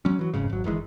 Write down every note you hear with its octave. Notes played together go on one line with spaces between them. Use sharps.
F#3 G#3 C#4
E3 F#3
F#1 F2 G#2 C#3
G#1 F#3
G1 D#3 E3 G#3